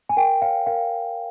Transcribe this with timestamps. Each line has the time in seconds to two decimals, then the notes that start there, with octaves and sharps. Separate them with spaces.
0.09 G#5
0.17 A#4 G5
0.42 C#5 F5
0.66 A#4 F5